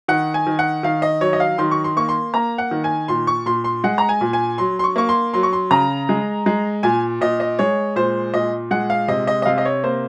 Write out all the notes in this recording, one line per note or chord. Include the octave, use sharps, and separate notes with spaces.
D#3 F#5
G#5
D#3
F#5
D#3 F5
D#5
F#3 C#5
D#5
F5
D#3 C6
C#6
C6
A#3 C#6
C6
A#3 A#5
F#5
D#3
G#5
A#2 C6
C#6
A#2 C6
C6
G#3 F#5
A#5
G#5
A#2
G#5
F#3 C6
C6
C#6
A#3 C#6
C6
F#3 C6
C#6
C6
C#3 A#5
G#3
G#3
A#2 G#5
A#2 D#5
D#5
G#3 C#5
A#2 C5
A#2 D#5
G#3 F#5
F5
C3 D#5
D#5
D#5
C3 F5
D#5
C#5
A#3 C5